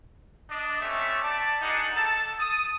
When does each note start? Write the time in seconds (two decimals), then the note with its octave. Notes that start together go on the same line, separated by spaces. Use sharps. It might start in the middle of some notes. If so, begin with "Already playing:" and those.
0.51 D4 D5 D#5
0.81 G3 A3 C4 C#4 E5
1.23 D5 A5
1.62 D4 D#4 F4 G#4 D#5 F#5
1.95 A4 A5
2.40 D#6